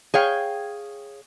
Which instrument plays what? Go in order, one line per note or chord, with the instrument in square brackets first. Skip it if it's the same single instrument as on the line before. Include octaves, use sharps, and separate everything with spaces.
[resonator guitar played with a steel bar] G#4 C#5 F5 G5